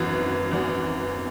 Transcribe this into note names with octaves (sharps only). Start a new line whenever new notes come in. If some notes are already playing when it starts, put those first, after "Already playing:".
Already playing: G#1 F#2 E3 B3 F#4
G#1 F#2 E3 B3 F#4